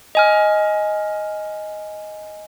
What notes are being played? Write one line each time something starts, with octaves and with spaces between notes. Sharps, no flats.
D#5 G#5 F6